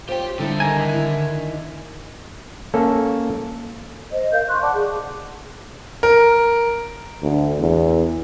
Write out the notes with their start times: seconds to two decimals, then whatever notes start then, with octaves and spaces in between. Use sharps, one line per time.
0.09 F4 G4 C5 C#5 G5
0.39 D3 G3 D#4 E4 A4
0.60 D#3 G#5 A#5
0.79 E5
0.94 E4
2.74 A#3 C#4 A4
4.12 C5 D#5
4.32 A#4 F5 G6
4.48 C6 C#6 F#6
4.62 D5 F#5 A5 D6
4.74 G#4
6.03 A#4
7.22 D2
7.60 E2